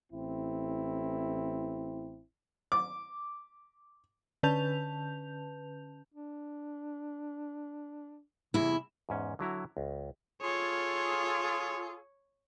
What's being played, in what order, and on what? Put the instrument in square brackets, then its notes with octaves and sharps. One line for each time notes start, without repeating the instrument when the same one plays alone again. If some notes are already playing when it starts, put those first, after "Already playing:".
[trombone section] A1 C4 E4
[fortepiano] D6
[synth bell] D3 C#4 B4 A5 G6 F7
[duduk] D4
[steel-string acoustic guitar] E2 E4 [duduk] C3
[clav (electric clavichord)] E2 G#2 C#4
D3 F#3 E4 A#5
C#2
[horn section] F4 G#4 A4 [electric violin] C#5